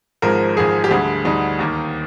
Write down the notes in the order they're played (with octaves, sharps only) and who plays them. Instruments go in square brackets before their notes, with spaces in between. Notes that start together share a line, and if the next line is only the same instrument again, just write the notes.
[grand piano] G#1 G#2 F3 G#3 A#4
G#1 G#2 F3 G#3 G#4
G4
D2 D3 G3 G#4
D2 D3 G3 D#4
D#2 D#3 A#3